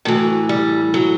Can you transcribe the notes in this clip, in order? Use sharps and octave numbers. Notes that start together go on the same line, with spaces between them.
A2 E3 F#3
G3
F#3